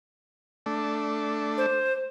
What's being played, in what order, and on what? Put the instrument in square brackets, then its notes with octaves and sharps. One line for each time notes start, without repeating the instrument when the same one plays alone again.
[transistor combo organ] A3 D4
[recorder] C5